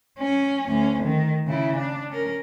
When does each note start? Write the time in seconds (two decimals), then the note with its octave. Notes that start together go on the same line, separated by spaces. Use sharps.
0.19 C#4
0.67 D2 C#4
1.03 D#3
1.47 C#3 E4
1.77 D4
2.10 C#4 A#4